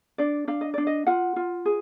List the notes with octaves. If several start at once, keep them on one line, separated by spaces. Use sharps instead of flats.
D4 D5
D4 F5
D#5
D4 D5
D#5
F4 F#5
F4
G#4